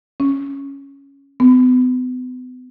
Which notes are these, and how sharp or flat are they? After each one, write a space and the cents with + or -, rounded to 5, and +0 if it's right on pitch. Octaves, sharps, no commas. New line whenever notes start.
C#4 +0
B3 +35